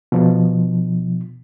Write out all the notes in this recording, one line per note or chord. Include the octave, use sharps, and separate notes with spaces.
B2 F3